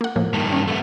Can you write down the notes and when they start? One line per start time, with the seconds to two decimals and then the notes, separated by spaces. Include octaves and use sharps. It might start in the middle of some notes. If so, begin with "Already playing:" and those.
0.01 A#3 F#5
0.16 A2 F3 A#3
0.34 G2 D#3
0.53 C#4
0.68 A3 B3